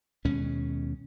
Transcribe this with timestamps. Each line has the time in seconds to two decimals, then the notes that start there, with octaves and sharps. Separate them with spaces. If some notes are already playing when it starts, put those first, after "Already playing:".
0.25 D#2 B2 G#3 C#4